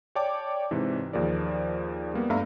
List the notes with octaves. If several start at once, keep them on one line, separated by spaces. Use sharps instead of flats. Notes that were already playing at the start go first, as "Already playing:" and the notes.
C#5 D5 G5 A5 D6
G#2 C3 E3
D#2 F3 G#4 A#4 D5
G3 A#3 B3
G2 A3 E5 F5 A#5